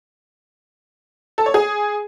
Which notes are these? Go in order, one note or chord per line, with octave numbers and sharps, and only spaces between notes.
A4
C#5
G#4